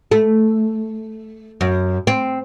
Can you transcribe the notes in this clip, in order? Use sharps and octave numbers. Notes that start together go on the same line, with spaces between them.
A3
F#2
C4